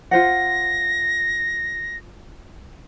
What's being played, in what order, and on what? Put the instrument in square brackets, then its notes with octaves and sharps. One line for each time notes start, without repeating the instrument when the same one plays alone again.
[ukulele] F4 C5 F#5 [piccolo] A#6